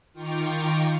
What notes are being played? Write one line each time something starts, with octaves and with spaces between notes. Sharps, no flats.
D#3 F4 G5 A#5 C#6 D6